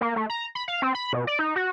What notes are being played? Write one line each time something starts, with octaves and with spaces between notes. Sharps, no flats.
A#3
A3
A#5
B5
F5
C4
B5
B2
D5
D#4
F#4